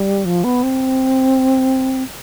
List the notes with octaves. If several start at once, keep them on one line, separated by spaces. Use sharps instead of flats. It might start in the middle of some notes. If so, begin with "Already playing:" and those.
Already playing: G3
F3
B3
C4